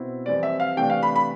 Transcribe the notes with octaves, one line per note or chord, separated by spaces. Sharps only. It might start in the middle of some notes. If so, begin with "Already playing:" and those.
Already playing: B2 C4 E4
F2 E3 G3 D5
E5
F5
C3 E3 A3 D4 G5
F5
B5
B5